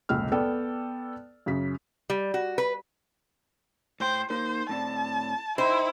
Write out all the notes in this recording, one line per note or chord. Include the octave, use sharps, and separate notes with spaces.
F1 C#2 A#2 G#3 E6 F6
B3 A4 D5 G5
F#2 C#3 B6
G3
F#4
B4
A2 C5 G5
A#3 D#4 A#4 C5
A2 C4 D5 A5
D#4 E4 C5 D#5 G5